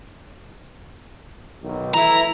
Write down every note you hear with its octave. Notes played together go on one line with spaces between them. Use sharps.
B1 D#3
E3 A3 E4 A#5